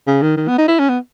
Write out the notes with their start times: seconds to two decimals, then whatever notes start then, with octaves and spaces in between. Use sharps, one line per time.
0.07 C#3
0.22 D#3
0.37 D#3
0.48 B3
0.58 D#4
0.68 E4
0.79 C#4
0.89 B3